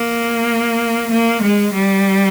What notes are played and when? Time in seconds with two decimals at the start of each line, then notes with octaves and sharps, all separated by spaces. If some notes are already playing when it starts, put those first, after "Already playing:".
Already playing: A#3
1.11 A#3
1.43 G#3
1.74 G3